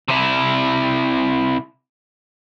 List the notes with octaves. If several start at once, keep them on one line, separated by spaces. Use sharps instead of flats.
C3 E4